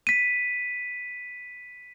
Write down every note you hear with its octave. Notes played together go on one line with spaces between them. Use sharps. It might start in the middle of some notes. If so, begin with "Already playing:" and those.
B6 D#7